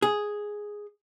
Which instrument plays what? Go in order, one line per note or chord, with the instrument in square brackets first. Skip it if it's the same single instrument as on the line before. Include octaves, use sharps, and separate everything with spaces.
[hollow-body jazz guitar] G#4